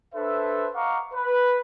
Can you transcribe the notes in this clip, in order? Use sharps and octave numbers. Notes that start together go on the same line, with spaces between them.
D4 A4 B4 C5 E5
D#5 F5 F#5 A#5 C#6 D6
B4